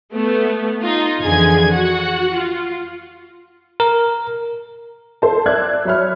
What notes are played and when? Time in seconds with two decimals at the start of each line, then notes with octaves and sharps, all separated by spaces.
0.13 A3 B3
0.82 D#4 F4
1.23 F2 D3 E3 G#4 G#5 G#6
1.70 F#4 F#5
2.33 F4
3.80 A#4
5.22 A4 C5 A5
5.46 D5 E5 E6 F#6 G#6
5.85 F#3 C#5 E5 B5 F6